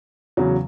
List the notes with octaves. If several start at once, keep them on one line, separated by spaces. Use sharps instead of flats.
E2 C#3 F#3